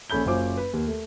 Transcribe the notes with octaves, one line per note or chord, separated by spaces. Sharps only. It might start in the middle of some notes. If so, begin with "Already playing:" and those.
A#1 C#4 A4 B5 G6 G7
F#1 F#2 C#4 F4 C5 D6
B4
D#2
A3